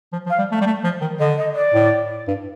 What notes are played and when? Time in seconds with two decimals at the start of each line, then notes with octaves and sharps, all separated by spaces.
0.13 F3
0.26 F3
0.30 F5
0.38 G3
0.52 A3
0.61 G3
0.66 A3
0.84 F3
1.01 D#3
1.19 D3 D#5
1.37 D#5
1.55 D5
1.74 A2
2.28 G2